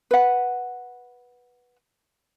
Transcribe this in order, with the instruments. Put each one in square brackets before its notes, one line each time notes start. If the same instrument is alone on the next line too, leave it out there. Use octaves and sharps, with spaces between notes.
[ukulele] B4 F#5